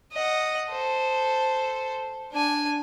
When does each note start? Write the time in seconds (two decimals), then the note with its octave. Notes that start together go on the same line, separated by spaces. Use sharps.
0.13 D#5 F#5
0.70 A4 C5
2.32 D4 G#5